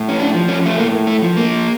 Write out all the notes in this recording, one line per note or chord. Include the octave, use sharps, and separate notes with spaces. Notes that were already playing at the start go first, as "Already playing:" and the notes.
Already playing: A2
C#4
D4
F3
C#4
A3
A2 A#3
A3
F3
A#3